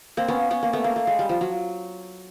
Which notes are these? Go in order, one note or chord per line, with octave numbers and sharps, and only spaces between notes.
A#3 C4
B3 C#4
B3 C#4
A#3
A3 B3
A#3
A3
G#3
G3
F3
F#3